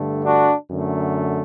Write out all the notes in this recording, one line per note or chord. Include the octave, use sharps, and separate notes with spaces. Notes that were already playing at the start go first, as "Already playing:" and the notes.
Already playing: G2 D3 A3
D4 F#4
F#2 D3 A3